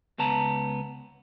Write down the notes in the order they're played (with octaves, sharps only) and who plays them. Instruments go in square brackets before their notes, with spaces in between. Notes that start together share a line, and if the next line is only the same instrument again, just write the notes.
[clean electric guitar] C#2 B3 A5 A#5